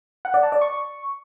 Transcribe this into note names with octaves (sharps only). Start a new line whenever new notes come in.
F#5
D5
A5
D5
C#6